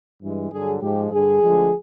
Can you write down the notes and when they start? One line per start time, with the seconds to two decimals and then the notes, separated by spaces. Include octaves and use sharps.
0.22 G2 E3 G#3
0.51 G2 D3 F#3 G#4
0.81 G#2 F3 G#3 G4
1.11 G2 D3 G3 G#4
1.41 D2 D3 F3 G#3